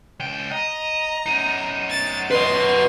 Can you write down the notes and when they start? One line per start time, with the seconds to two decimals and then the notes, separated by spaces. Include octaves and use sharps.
0.20 C#2 G5
0.51 D#5 A#5
1.26 F#2 D#4
1.90 A6
2.31 B4 D#5 C6